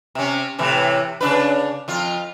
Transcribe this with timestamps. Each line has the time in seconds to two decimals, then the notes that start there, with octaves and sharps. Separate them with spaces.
0.15 C3 C#4
0.58 A2 C3 E3
1.21 C#3 D4 B4
1.88 F2 F4